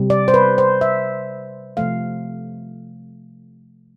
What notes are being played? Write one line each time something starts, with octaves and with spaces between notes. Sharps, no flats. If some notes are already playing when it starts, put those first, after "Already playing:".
Already playing: C3 G3
D5
C5
B4
C5
E5
C3 F3 A3 F5